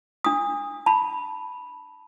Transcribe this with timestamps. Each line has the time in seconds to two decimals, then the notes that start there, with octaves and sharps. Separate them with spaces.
0.24 D4 D#6
0.86 A5 B5